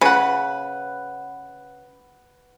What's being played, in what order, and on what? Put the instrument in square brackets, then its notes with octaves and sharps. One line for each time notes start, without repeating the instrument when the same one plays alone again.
[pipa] C#3 [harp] B4 F#5